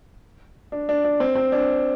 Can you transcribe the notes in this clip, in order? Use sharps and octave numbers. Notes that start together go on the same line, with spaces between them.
D4
D4
D4
C4
C4
D4